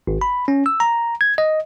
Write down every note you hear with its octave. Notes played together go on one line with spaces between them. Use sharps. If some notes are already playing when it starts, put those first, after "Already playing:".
G#1
B5
C#4
E6
A#5
G#6
D#5